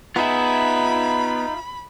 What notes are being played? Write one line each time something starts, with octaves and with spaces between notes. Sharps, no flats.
B3 D#4 F4 G#4 E5 B5